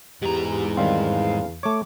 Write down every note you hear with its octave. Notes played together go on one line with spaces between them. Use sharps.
E2 G#2 G4 A#5
D#3 G3 C4 F5
A3 C#5 D6